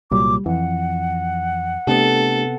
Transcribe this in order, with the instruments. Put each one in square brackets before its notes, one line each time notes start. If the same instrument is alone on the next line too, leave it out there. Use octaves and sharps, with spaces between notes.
[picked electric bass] C2 A#2 F#3 [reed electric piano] G3 [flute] D6
[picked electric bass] F2 [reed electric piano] E3 [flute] F#5
[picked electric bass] C3 B3 [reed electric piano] A3 D4 G4 [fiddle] A4